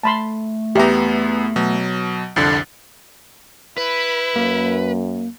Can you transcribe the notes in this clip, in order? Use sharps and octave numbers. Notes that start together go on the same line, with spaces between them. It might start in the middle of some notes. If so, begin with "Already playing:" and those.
A3 A5 B5 C6
E2 B3 G4 E5 A#5
B2 F#3
C2 F2 D3 A6
E4 B4
F#2 A#3